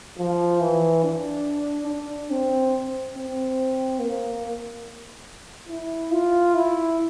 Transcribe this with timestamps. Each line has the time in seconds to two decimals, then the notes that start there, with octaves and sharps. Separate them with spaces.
0.18 F3
0.61 E3
1.04 D4
1.88 D4
2.31 C4
3.15 C4
3.99 A#3
5.69 E4
6.12 F4
6.55 E4